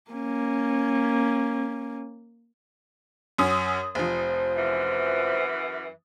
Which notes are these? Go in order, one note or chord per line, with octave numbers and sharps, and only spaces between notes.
A#3 C#4
F#2 C#4 D#6
F1 F3 C5
F#2 E3